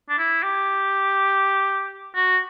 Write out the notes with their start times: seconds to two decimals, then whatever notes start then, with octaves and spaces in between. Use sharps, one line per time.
0.09 D4
0.18 E4
0.43 G4
2.15 F#4